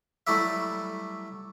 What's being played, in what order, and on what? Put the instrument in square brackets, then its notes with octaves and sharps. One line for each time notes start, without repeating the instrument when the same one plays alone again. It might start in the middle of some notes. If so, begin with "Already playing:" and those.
[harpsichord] F#3 G3 A3 E4 D5 E5